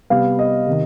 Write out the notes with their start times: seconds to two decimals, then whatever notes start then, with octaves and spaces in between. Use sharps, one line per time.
0.10 C3 G3 B3 F5
0.39 D#5
0.67 C3 D#3